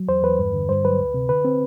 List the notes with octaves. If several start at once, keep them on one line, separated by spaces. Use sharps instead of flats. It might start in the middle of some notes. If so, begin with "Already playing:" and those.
Already playing: F#3
E2 C5
E2 B4
G2
D3
G2 C5
F#3 B4
D2
C3
D3 B4
C4